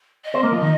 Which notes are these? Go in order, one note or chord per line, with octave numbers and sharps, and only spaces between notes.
D#5
C4 C5
A#3 A#4
F3 F4
D#3 D#4